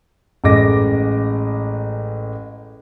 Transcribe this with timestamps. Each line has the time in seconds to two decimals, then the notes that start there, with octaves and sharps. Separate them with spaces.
0.44 A1 G#3 D#5 D6 A#6